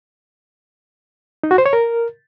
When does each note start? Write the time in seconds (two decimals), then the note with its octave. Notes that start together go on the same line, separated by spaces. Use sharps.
1.43 D#4
1.51 F#4
1.58 C5
1.66 C#5
1.73 A#4